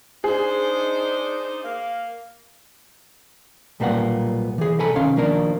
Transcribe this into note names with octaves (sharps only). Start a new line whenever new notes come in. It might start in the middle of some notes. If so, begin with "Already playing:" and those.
D4 D#4 G#4 C5
A#3 F5
B1 A#2 G3 A#3 B3 F#5
E3 G#4
C2 A4 G#5 A#5 B5
C2 D#3 C#4 F5 C6
B2 D#3 F3 A#3 D4 A#4